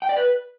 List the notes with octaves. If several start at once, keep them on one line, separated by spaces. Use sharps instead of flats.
G5
D5
B4